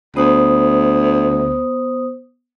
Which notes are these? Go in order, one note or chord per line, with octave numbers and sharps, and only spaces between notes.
D2 B3 C5 D#6